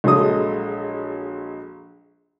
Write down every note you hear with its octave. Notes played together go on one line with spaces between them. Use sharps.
A#1 F#3 G#3 A4 D#5 D#6